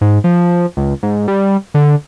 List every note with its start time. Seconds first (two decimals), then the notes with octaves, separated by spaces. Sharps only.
0.01 G#2
0.24 F3
0.77 C#2
1.03 G#2
1.28 G3
1.74 D3